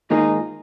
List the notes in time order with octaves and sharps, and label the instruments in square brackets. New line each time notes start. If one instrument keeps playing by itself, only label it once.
[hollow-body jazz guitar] G#2 D#3 A#3 F4 G#4 [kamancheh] D#4